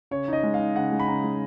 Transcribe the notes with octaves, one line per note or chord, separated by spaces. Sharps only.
C#3 C#5
D#4 D#5
G#3
F5
D#4
C#3 F#5
G#3
B5
C#3 A#5
G#3